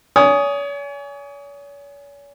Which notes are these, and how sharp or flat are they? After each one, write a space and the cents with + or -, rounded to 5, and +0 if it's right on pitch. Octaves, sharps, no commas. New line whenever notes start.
C#5 +40 G#5 +0 D#6 +0